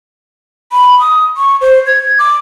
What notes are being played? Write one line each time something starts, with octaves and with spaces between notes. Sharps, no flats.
B5
D#6
C#6
C5
G#6
D6